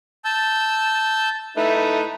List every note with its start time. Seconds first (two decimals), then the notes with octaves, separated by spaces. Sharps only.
0.25 A5 E6 G6
1.57 A3 D#4 E4 B4